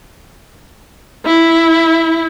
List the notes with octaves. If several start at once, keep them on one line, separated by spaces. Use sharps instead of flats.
E4